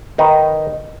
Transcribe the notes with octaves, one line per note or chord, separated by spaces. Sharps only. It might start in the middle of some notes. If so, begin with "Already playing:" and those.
D#3 D#4 B4